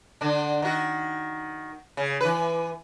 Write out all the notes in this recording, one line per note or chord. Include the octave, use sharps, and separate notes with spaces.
D3 D4
D#3 F#4
C#3
E3 B4